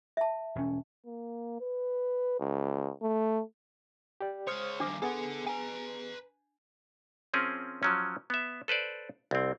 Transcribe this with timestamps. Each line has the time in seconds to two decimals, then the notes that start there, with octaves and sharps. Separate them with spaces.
0.17 E5 A5
0.55 E1 C#4
1.06 A#3
1.61 B4
2.39 C#2
3.02 A3
4.21 G4 D5
4.47 G#3 C5 C#5 D#6 F6
4.80 G2 D#3 D4 D6
5.02 B3 G#4 A4 F#5
5.47 B4 G#5 A#5
7.34 F3 C4 C#4 G#4 A#4
7.83 F3 F#3 C#4
8.30 B3 E5
8.68 A4 B4 C5 D5
9.31 C2 C4